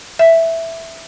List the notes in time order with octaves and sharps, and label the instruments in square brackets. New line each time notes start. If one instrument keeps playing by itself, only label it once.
[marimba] E5